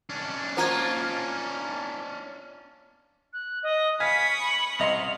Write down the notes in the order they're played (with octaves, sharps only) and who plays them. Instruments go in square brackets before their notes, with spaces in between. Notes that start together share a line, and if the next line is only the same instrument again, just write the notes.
[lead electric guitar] C#4 D4
[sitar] A#3 F4 [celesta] C5 A#5 G#6
[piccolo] F#6
D#5
[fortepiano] F5 G#5 [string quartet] B5 C#6 D#6 [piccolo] B6
[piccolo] F#7
[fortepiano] C2 D#5 C6 [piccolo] F7